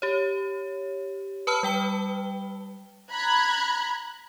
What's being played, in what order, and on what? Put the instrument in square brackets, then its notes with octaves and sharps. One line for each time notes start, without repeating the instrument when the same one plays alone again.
[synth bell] G4 C#5
B4 A5 B5 E6 F6
G3 G5 G7
[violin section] A#5 B5 F#6 G#6